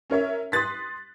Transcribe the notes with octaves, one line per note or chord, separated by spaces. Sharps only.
C#4 A#4 C#5 E5
C6 D#6 F#6 A6 B6